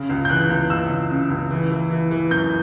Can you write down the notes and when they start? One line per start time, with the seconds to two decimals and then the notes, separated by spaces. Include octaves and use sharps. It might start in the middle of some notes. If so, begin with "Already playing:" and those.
Already playing: C#3
0.09 C#2
0.25 G6
0.29 E3 F#6
0.50 C#2
0.70 C#2 E6
0.90 C#2
1.10 C#3
1.30 C#2
1.50 E3
1.71 E3
1.91 E3
2.11 E3
2.31 F#2 G6